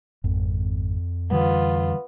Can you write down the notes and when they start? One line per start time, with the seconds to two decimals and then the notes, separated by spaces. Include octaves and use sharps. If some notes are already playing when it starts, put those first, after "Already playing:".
0.24 G#1 F2
1.31 D3 E3 G3 B3 F4